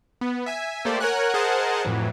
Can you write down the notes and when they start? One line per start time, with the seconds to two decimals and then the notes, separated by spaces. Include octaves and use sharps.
0.21 B3
0.46 E5 G#5
0.85 A3 A#3 G4 A4 C5 D5
1.00 A#4 C#5 F#5 G#5 F#6
1.34 G#4 A#4 C5 D#5 F#5 A5
1.85 F2 A2 E3 F#3